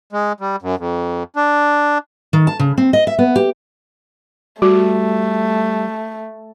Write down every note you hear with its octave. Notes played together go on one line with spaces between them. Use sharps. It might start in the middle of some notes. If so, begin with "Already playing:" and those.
G#3
G3
F#2
F2
D4
D#3
A5
C#3
C4
D#5
E5
B3
G4
G3 A3 F#4